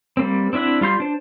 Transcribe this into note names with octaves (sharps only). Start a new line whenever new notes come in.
G3 A#3 C4
C4 D4 E4 E5 F#5
G3 F4 C6 G6
D4 C5